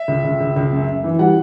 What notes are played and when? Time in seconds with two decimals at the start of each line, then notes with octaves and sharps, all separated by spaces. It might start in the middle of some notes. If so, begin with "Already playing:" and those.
Already playing: E5
0.08 C#2
0.24 C#2
0.41 C#2
0.56 C#2
0.73 F#2
0.88 F#2
1.04 E3
1.19 G3 F#5